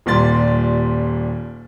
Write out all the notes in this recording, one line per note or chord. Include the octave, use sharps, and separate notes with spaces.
D#1 A#2 G3 C6 A6